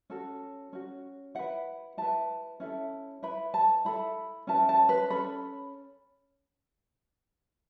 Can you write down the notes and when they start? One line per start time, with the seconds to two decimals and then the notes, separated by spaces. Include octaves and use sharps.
0.10 C#4 F#4 A4
0.73 C#4 F#4
1.35 E4 B4 F#5
1.98 E4 B4 A5
2.60 C#4 E4 A4
3.23 E4 B4 B5
3.54 A5
3.85 E4 A4 B5
4.47 C#4 E4 B4 A5
4.69 A5
4.89 B4
5.10 C#4 A4 B5